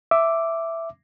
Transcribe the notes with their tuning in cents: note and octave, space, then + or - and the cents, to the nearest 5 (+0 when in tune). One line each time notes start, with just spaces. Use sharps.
E5 +5 D6 +0